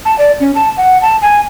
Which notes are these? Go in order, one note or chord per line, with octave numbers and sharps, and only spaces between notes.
A5
D5
C#4
A5
F#5
A5
G#5